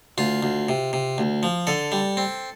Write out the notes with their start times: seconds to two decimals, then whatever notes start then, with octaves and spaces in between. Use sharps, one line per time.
0.18 D2 F4
0.43 D2
0.69 C3
0.93 C3
1.18 D2
1.43 F3
1.67 D3 A4
1.92 G3
2.17 C4